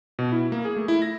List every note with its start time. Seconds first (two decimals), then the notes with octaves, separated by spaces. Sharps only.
0.19 B2
0.32 E4
0.52 A#3
0.65 G#4
0.76 A3
0.88 E4
1.02 A#6